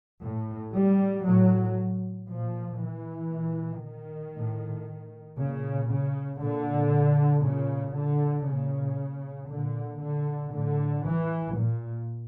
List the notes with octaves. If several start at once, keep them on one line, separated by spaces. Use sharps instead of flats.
A2
G3
A2 F#3
A#2 F3
E3
A#2
D#3
A2
A#2 C#3
C#3
A#2 D3
A#2 C#3
D3
A#2 C#3
A#2 D3
D3
A2 D3
E3
A#2